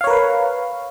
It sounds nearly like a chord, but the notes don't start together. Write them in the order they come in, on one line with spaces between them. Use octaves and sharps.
F5 C#5 A#4 B4